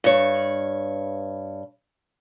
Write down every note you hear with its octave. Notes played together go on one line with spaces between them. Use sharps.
G2 C#5